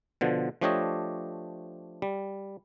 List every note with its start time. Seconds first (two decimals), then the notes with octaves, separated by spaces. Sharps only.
0.21 B2 D3 F3
0.61 F3 A3 D4 G4 C#5 D#5
2.02 G3